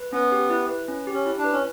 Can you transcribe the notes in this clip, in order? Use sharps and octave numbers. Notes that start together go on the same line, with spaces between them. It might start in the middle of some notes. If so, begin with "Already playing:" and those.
Already playing: B4
B3 C#4
G4
E4
B4
C#4
G4
C#4
E4
D4
B4
C#4